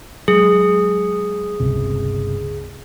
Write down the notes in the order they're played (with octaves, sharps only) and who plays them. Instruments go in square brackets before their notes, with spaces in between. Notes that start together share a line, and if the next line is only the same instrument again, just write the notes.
[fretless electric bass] F#3 G#3 [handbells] G#4
[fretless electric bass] G1 C#2 C3